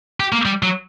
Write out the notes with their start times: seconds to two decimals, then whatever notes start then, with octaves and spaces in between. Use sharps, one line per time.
0.20 G4
0.33 A#3
0.45 G3
0.63 F#3